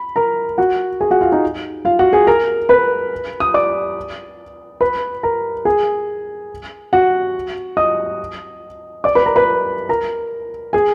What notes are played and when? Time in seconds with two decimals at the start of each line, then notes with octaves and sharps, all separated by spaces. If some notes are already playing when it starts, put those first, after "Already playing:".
Already playing: B5
0.16 A#4 A#5
0.58 F#4 F#5
1.01 G#4 G#5
1.11 F#4 F#5
1.21 F4 F5
1.32 D#4 D#5
1.85 F4 F5
1.99 F#4 F#5
2.13 G#4 G#5
2.27 A#4 A#5
2.69 B4 B5
3.40 D#6
3.54 D5 D6
4.81 B4 B5
5.23 A#4 A#5
5.65 G#4 G#5
6.93 F#4 F#5
7.77 D#5 D#6
9.04 D5 D6
9.15 B4 B5
9.26 A#4 A#5
9.36 B4 B5
9.89 A#4 A#5
10.73 G#4 G#5